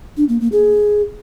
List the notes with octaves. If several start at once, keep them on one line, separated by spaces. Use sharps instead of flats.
D4
A#3
A#3
G#4